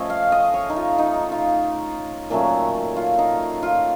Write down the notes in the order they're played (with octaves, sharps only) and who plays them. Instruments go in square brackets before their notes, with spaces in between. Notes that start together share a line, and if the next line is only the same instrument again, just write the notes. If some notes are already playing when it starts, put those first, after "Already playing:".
Already playing: [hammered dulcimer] F3 A3 C#4 D#5
F5
D#5
C#5
D#4
F4
D#4
F4
A#2 F#3 A3 C#4
F4
D#4
F4